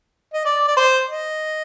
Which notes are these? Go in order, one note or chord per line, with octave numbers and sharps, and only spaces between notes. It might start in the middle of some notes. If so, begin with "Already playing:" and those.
D#5
D5
D5
C5
D#5